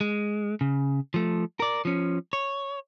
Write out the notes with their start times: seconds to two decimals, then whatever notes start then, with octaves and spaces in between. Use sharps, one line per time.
0.01 G#3
0.61 C#3
1.14 F3 A3
1.60 A#4 D5
1.85 F3 C#4
2.33 C#5